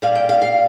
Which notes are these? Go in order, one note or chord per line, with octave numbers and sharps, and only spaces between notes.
A#2 G3 F5
G5
F5
F5